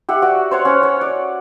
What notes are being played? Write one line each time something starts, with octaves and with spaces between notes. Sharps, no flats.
G4 E5 F#5
F#4 D5
C5 C#5 F#5
C#4
C#5
D5